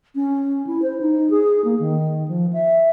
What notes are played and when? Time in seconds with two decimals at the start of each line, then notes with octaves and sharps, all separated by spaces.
0.15 C#4
0.67 E4
0.82 C5
1.01 D#4
1.30 G#4
1.64 A#3
1.79 D#3
2.28 F3
2.53 E5